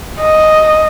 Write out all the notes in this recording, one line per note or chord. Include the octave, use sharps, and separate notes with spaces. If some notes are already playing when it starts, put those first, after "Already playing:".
D#5